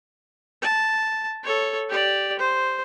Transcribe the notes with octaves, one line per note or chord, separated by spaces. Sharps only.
A5
A4 C#5
G4 D5
C5